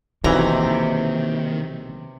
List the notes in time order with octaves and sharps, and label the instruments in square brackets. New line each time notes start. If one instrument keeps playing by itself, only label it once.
[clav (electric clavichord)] B1 E3 [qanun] C3 A#5 [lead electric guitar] D#3 [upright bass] A#3